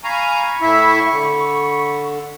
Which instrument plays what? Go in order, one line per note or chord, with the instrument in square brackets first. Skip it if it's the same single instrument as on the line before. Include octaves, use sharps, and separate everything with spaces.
[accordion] F5 G#5 A#5 [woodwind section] B5 C#6
[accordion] A2 E4 E5
D3